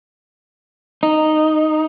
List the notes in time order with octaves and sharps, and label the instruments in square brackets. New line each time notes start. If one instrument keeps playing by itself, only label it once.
[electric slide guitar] D#4